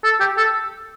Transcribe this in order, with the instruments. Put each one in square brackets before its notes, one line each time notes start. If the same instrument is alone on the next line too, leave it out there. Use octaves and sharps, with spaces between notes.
[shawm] A4
G4
A4